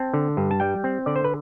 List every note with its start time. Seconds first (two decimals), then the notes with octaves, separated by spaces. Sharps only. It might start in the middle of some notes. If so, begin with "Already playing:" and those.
Already playing: C4 A5
0.14 D3
0.37 G2
0.51 A5
0.60 G3 G5
0.84 C4
1.06 D3 D5
1.16 C5
1.24 B4